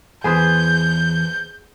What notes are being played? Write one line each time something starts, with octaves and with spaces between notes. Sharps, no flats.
E2 G#4 B4 C5 G6